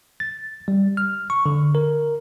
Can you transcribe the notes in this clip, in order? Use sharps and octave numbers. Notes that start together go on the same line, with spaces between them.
A6
G3
F6
C#6
D3
A#4